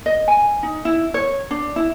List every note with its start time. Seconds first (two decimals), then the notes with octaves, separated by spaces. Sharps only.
0.06 D#5
0.28 G#5
0.63 D#4
0.85 E4
1.14 C#5
1.51 D4
1.76 E4